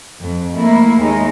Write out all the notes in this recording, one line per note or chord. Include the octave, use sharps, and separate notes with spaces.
F2
A3 A#3 E4
D#2 G#3 D#4